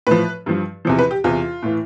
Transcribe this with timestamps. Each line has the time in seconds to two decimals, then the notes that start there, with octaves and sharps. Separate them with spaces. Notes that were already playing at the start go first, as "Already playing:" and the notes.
0.07 A2 F3 B4
0.46 G2 F3
0.85 E2 C3 F3
0.99 B4
1.11 G4
1.24 E2 C3 E3 F4
1.63 A2 E3